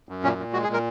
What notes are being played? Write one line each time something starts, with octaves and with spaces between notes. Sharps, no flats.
F#2
A#2 C#4
A#2
G#3 F#4
G#4
A#2
A#4